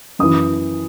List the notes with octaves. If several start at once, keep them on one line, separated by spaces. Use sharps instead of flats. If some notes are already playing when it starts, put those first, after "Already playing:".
F#2 E3 D#6